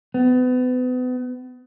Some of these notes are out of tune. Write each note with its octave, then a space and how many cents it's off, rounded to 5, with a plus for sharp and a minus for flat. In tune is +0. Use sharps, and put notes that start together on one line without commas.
B3 +35